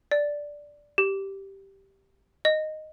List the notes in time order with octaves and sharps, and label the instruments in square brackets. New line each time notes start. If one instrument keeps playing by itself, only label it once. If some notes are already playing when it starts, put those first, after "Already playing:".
[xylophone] D5
G4
D#5